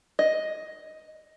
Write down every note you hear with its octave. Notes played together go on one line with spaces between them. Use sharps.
D#5